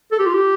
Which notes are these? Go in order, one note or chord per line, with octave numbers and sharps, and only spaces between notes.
A4
G4
F4
G4